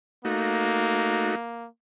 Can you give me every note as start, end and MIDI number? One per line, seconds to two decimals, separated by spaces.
0.25 1.35 57
0.25 1.68 58
0.25 1.35 63
0.25 1.35 66